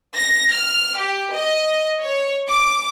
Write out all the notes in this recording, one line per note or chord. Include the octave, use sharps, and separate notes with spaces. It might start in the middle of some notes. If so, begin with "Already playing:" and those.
A#6
F6
G4
D#5
C#5
D6